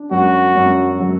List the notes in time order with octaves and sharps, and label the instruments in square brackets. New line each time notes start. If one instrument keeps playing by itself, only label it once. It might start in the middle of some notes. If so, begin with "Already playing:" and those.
Already playing: [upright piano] D4
[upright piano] F#2 [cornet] F#4
[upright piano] F#2
F#3